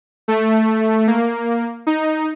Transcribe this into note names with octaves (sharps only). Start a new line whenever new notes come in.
A3
A#3
D#4